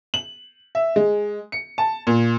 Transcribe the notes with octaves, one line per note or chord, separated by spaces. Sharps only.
F#7
E5
G#3
C#7
A5
A#2